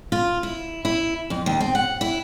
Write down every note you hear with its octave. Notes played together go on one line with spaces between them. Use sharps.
F4
E4
E4
F2
D#2
C4
F#5
E4